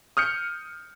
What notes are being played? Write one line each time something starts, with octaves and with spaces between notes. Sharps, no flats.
D#6 F6 G6 C#7